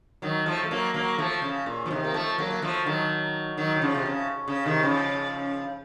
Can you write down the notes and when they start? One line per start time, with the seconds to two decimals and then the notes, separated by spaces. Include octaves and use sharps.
0.22 D#3 F#3
0.46 F3 A3
0.64 A3
0.71 F#3 A#3
0.94 F#3 A#3
1.18 F3 A3
1.42 C#3
1.66 A#2
1.86 F3
1.91 C3 D#3
2.04 A#3
2.14 F3 A3
2.38 F#3 A#3
2.50 A#3
2.62 F3 A3
2.86 D#3 F#3
3.57 D#3 F#3
3.76 F#3
3.82 C#3 F3
3.95 C3
4.06 C#3
4.48 C#3
4.66 C3 D#3
4.83 C#3 F3